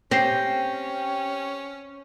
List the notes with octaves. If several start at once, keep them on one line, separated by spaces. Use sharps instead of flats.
C4 C#4 G4 A#6 C7